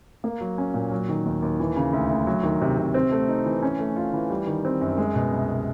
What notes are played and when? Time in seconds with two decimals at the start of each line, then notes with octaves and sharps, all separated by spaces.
0.24 A#3
0.41 F#3
0.58 C#4
0.74 A#2
0.91 F#3
1.09 D#3
1.26 D#2
1.42 D#2
1.60 E3
1.76 C#3
1.93 D2
2.10 D2
2.27 F#3
2.43 D#3
2.61 C3
2.78 C3
2.94 C4
3.11 A3
3.28 D#4
3.46 E3
3.62 C#4
3.79 A3
3.96 F4
4.14 E3
4.30 G3
4.47 D#3
4.65 C4
4.81 F#2
4.97 G#3
5.15 B2
5.31 C2
5.48 C2